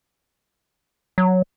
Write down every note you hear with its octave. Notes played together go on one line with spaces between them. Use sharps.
F#3